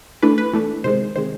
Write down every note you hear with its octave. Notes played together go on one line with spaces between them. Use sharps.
E3 A3 D4 B4
B4
E3 A3 D4
C3 D#3 G#3 C5
C3 D#3 G#3 C5